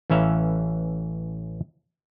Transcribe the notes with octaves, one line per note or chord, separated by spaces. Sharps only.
A1 E3 C#4 E5 F5 A#5